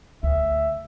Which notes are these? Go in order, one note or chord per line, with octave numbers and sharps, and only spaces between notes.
D2 E5